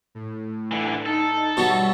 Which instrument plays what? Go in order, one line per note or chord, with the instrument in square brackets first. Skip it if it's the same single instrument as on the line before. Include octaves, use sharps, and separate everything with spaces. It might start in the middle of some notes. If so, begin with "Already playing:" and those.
[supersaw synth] A2
[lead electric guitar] D3 E3
[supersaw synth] D#4 [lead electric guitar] A4
[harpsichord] B2 F#3 [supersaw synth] G3 E5